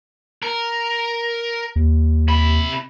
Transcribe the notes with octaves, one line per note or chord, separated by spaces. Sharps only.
A#4
D#2
C3 B5